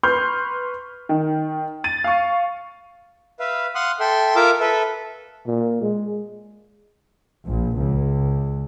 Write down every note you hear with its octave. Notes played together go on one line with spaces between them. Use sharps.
B4 C6 C#6 F6 G6
D#3
A6 D#7
F5 C#6
B4 E5 F5
F5 F#5 C6 D#6 F#6
A4 E5 G5 C6
F4 A#4 E5 F5 D6 E6
A4 B4 E5
A#2
G#3
A#1
C#2